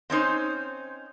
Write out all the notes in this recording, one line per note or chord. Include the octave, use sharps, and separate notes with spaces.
C4 C#4 D#4 C5